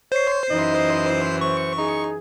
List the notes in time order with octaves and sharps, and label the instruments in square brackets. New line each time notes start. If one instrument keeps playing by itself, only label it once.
[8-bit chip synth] C5 C7 [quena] C#5
[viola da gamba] F#2 E3 [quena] D#4 [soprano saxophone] D#5
[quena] C5 [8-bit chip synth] C#6
[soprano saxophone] D#4 [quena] G#4